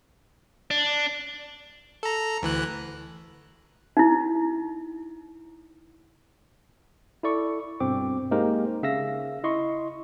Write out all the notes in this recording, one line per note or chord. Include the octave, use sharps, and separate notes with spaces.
D4
A4 A#5
D2 E3 F#6
D#4 E4
E4 A4 D5 C#6
G2 B2 C4 D6
G#3 A#3 D#4 G4 A#4 C5
C#3 E5 F5 E6 A#6
E4 D#5 C6 C#6